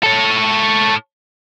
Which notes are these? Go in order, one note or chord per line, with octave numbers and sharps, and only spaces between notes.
A4 C#5